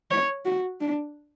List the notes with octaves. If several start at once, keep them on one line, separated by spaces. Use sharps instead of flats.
C#5
F#4
D4